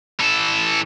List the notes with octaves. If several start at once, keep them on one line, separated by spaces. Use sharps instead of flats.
E3 A4